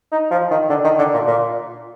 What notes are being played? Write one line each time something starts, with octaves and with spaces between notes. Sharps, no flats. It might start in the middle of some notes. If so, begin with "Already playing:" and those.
D#4
F3
D#3
D3
D#3
D3
A#2
A#2